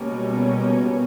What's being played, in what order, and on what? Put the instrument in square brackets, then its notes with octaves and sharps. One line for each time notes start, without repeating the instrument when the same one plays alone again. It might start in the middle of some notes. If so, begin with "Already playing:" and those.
Already playing: [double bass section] C#2 B2 G3 A#3 C#4
[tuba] B3